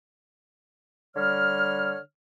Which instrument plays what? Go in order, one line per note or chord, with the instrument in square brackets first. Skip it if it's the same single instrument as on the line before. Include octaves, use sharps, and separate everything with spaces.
[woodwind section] D3 G3 C#5 F6